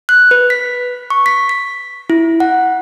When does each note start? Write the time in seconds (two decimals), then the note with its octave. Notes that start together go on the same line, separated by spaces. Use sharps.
0.09 F#6
0.31 B4
0.50 B6
1.10 C#6
1.26 B6
1.49 B6
2.10 E4
2.40 F#5